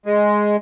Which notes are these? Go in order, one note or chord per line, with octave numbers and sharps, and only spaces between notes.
G#3